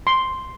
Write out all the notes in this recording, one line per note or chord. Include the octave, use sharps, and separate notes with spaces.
C6